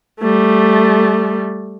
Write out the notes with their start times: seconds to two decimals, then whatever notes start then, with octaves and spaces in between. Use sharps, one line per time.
0.21 G3 A3